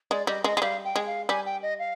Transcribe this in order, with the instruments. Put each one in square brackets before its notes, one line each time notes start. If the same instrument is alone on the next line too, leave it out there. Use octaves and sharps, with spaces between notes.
[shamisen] G#3 [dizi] D5
[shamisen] G3 [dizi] D#5
[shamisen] G#3 [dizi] D#5
[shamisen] G#3
[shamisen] G3 [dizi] F5
[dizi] G5
[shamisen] G#3
[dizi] F5
[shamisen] G3 [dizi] G#5
[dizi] G5
D#5
F5